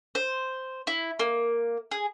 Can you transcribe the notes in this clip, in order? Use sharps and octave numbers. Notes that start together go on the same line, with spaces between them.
C5
E4
A#3
G#4